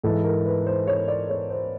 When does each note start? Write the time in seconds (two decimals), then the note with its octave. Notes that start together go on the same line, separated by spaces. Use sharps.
0.04 G#2 E3 A4
0.24 A#4
0.46 B4
0.66 C5
0.87 C#5
1.08 D5
1.30 C#5
1.50 C5